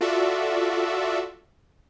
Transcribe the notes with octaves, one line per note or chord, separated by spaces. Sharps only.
F4 F#4 A4 D5 E5